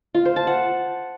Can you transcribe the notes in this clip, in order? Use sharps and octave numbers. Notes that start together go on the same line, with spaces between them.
F4
C5
A5
F#5